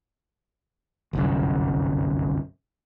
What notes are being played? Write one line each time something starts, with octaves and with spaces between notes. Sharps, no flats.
G1 C2 F#2